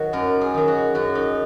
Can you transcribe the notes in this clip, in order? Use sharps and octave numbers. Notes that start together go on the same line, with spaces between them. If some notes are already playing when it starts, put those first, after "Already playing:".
Already playing: D#3 F#3 F#4
F#2 A#4
G#4
D#3 F#3
F#4
F#2 F#4
D#4